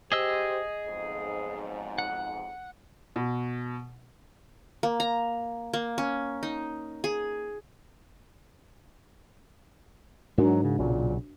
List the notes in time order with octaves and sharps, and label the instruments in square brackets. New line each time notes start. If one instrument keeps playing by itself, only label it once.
[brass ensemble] G4 C5 [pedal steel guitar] G#4 D#5 E6
[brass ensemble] B1 F2 G#2
[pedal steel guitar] F#5
[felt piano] B2
[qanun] A#3
A#5
A#3
C#4
D#4
G#4
[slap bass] G#2 [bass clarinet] F#3 [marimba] D4 F#4 A#4
[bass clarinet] C#3
[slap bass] B1 C#3 F#3 [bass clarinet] A#2